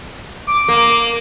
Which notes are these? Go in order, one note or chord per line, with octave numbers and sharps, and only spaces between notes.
D6
A#3